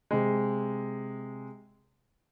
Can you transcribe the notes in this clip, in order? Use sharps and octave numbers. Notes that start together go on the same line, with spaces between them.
C3 G#3